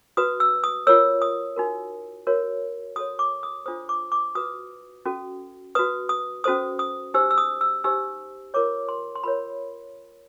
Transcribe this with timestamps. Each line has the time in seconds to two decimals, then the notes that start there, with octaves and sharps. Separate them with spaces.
0.17 F#4 B4 D#6
0.40 E6
0.64 D#6
0.87 F4 A#4 C#5 E6
1.22 D#6
1.56 D#4 F#4 A#4
2.27 F#4 A#4 C#5
2.96 F#4 A4 C#5 D#6
3.19 D6
3.43 D#6
3.66 D4 F4 A4 C5 D#6
3.89 D6
4.12 D6
4.35 F#4 B4 D#6
5.05 C#4 F#4 A4
5.75 F#4 B4 D#6
6.09 D#6
6.44 C#4 F#4 A4 C5 D#6
6.79 D#6
7.14 D#4 G4 C5 E6
7.31 E6
7.38 D#6
7.61 E6
7.84 D#4 G4 C5 E6
8.54 F4 A#4 C#5 D6
8.89 C6
9.15 C6
9.24 F4 A#4 C#5 B5